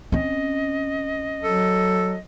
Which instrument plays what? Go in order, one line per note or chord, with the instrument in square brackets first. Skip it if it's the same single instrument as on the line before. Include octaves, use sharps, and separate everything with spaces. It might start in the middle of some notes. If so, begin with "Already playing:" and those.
[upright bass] C4 C#4 [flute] D#5
[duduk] F#3 [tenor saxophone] A4